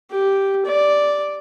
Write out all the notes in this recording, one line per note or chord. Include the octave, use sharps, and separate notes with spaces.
G4
D5